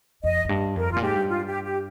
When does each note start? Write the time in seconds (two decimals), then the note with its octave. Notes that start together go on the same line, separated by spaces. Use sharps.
0.23 F2 D#5
0.45 F2
0.49 G2
0.76 F2 A#4
0.90 G2 F4
0.96 A#2
1.02 G#2 G4
1.16 G2
1.29 F4
1.46 G4
1.64 G4